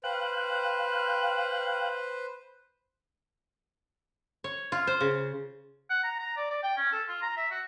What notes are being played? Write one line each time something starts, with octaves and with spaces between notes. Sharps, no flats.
B4 C5 F5 G5 F#6
C#5
F4
C5
C#3
F#5
A#5
A#5
D5
D5
G5
C#4
A4
F4
A#5
E5
F#4